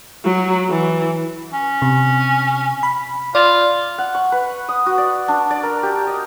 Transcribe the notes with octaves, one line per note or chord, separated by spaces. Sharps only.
F#3
E3
C#4
C3
B5
F4 D5
F#5
C#6
B4
D#6
F#4
D5
D4
D5
A#4
G4
D#5